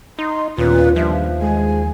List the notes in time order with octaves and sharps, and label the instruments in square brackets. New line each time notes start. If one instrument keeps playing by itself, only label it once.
[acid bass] D#4 [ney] C6
[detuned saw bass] D#2 [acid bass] A#2 [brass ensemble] B3 C#4 F4 [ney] B4
[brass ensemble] E2 G2 [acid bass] F3 [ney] E5
[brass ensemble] G#3 [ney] G#5